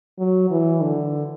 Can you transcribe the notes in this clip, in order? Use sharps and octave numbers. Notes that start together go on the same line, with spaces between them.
F#3
E3
D3